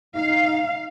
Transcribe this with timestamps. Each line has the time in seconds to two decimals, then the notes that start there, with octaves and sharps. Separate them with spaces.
0.15 D#4 F5